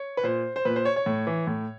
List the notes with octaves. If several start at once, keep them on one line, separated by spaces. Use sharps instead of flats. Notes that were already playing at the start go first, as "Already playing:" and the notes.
Already playing: C#5
B4
A#2 C5
C5
A#2 B4
C5
C#5
C#5
A2
E3
A2